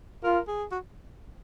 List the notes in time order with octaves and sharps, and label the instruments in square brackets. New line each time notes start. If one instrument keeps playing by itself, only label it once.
[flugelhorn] F4 [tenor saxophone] A#4
[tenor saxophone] G#4
F#4